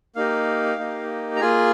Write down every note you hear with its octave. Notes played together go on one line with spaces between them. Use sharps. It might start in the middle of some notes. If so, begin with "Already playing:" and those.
A#3 D#4 G4 F5
A#3 D#4 G4
A#5
A#3 F4 G#4 G#5